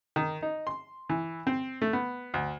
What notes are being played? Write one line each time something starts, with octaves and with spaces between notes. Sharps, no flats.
D#3
D#4
C6
E3
C4
A3
B3
D2